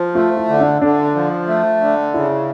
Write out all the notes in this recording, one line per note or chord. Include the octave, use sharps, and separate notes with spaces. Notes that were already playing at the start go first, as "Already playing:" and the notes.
Already playing: F3
A3 F4
E4
D3
D4
D3 D4
F3
A3
D3
C#3 E4